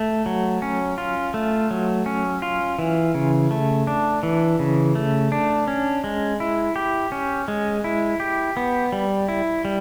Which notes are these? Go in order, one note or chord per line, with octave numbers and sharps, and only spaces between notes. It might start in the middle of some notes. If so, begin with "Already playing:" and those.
Already playing: A3
F#3
C#4
F4
A3
F#3
C#4
F4
E3
C#3
A3
D4
E3
C#3
A3
D4
C#4
G#3
E4
G4
C#4
G#3
E4
G4
B3
G3
E4
G3